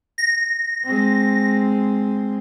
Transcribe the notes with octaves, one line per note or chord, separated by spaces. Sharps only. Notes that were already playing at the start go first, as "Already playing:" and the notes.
A#6
G#3 C4